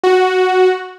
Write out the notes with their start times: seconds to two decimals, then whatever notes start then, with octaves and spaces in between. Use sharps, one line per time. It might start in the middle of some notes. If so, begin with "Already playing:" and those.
0.04 F#4